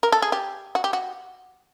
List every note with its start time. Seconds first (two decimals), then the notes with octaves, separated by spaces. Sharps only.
0.03 A#4
0.12 A4
0.22 G#4
0.32 G4
0.75 F#4
0.84 G4
0.93 F#4